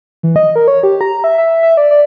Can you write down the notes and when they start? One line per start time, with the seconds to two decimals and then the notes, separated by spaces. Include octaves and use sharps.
0.23 E3
0.36 D#5
0.56 A#4
0.68 C#5
0.83 G4
1.01 A#5
1.24 E5
1.38 E5
1.63 E5
1.77 D5
1.91 D5